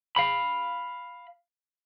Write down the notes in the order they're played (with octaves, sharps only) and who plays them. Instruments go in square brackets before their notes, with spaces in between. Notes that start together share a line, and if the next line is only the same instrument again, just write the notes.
[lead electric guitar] F5 B5